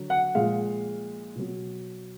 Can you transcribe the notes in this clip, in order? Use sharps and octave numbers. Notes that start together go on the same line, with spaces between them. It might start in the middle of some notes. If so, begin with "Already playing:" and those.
Already playing: D3 F#3
F#5
A#2 F3 G#3 F5
B2 F#3